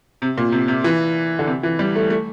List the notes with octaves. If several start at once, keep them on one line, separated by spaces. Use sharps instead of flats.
C3
A#2
C3
C3
E3
D3
C3
E3
G3
A3
A3